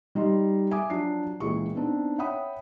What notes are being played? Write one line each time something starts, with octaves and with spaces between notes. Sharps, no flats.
G3 D#4 D#5 C6
E5 G#5 D6 D#6
F3 F#3 D4 C7
C#2 A#2 E3 G#4 C#6
B3 C4 D4 D#4
C#5 E5 F#5 G5 B5 D#6